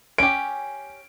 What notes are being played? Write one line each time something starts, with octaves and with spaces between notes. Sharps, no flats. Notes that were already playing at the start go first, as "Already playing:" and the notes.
C#4 G4 D7